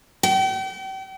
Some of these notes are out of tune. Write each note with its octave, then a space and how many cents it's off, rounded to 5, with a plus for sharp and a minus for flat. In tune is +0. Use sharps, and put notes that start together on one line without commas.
G5 -40